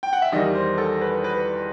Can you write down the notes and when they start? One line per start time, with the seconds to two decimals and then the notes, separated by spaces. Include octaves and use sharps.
0.03 G5
0.13 F#5
0.22 E5
0.32 E2 D#3 G3 D#5
0.55 C5
0.78 A4
1.01 B4
1.24 B4